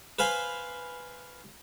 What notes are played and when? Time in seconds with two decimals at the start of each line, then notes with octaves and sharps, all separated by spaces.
0.19 B4 C5 F5 G#5 B5